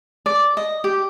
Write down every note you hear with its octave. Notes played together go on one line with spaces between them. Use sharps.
D5
D#5
G4